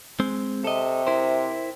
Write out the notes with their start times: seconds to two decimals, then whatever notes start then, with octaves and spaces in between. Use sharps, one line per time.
0.20 G#3 C4
0.64 C3 A4 D#5
1.07 E4 A#4 C5